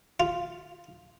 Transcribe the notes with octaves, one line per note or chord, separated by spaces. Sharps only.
F4